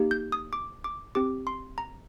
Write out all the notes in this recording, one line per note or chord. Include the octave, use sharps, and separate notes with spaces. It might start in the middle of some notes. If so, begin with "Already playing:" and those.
Already playing: A#3 D#4 G4
G6
D#6
D6
D6
C4 G4 D6
C6
A#5